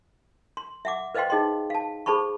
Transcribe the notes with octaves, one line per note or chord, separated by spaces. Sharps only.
C6
E5 F#5 D6
B4 C5 D#5 F5 G5 C6
D#4 G#4 D#5 G5 C6
F5 A5
G#4 C5 A5 B5 C#6